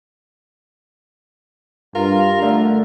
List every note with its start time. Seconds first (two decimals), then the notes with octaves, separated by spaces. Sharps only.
1.95 G2 F4 A#4
2.42 D3 A3